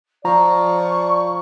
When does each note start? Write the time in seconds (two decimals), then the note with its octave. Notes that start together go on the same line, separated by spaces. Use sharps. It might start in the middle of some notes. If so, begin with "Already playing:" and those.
0.25 F3 D5 A#5 C#6